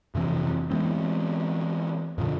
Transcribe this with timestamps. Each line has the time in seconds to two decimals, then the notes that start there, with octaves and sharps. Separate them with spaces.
0.14 F2 C3 E3 C4
0.70 E3 G#3 B3 C4
2.18 F2 A#2 D3